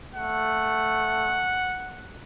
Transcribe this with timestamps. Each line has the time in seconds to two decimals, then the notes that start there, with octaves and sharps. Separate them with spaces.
0.15 A3 F#5